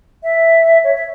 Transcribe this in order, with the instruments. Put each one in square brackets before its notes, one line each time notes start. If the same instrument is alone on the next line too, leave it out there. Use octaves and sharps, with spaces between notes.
[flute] E5
C#5
E5